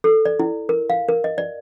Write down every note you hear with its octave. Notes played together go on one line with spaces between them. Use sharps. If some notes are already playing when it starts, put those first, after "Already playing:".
A4
D5
E4
A#4
F5
A#4
D#5
D5